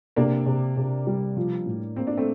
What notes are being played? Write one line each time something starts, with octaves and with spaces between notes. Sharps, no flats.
C3 A#3 D4
C3
C3
G3
F3
A2
A#3 C4
D4
A3 C4